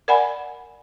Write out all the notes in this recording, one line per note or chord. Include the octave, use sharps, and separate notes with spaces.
A#4 D5 F#5 G#5 B5